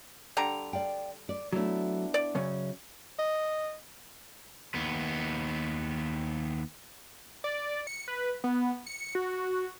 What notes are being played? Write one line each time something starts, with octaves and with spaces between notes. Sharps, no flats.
D3 G3 A#5
D5 F5 G5
D5
F#3 A3 B3 D4 E4
D5
F#2 C#3 C#4
D#5
D#2 B3
D5
C#7
B4
B3
C#7
F#4